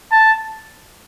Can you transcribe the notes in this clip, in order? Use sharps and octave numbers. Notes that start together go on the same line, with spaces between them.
A5